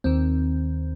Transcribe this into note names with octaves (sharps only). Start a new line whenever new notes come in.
D#2 D#3 C4